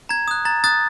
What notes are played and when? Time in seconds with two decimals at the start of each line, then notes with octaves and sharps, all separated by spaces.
0.09 A#5 G#6
0.28 D#6 F#6
0.45 A#5 A6
0.64 D#6 F#6 A6